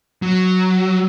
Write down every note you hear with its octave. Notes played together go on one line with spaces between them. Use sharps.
F#3